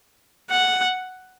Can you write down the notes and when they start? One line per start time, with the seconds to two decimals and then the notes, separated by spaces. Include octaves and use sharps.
0.50 F#5